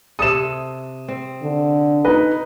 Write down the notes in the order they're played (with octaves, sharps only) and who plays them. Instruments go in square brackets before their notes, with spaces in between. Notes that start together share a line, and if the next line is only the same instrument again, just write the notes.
[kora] C3 A4 [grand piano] D#6 E7
[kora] C4
[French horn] D3
[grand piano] D#4 B4 [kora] D#5